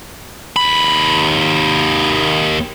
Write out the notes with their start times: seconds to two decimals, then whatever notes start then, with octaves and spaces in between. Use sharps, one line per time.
0.56 D#2 B5